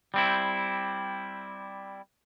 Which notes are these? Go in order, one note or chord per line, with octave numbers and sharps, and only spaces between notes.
G3 C4 E4